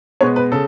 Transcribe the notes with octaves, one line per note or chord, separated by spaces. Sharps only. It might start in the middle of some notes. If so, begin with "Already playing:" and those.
B2 G#3 B3 C#5
B4
C#3 A4